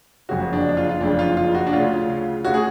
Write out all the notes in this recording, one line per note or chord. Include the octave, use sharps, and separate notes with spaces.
F#1 F2 C#3 F#4
D4
D4
F4
F4
F#1 F2 C#3 D4
F4
F4
F#4
D4
D2 C#3 F4
D2 C#3 F#4
G#4